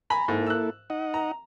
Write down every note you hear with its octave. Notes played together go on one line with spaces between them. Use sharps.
G#5 A#5 B5
G#2 A#3 E4 A4
E6 F#6
D#4 D#5 F#5
A#5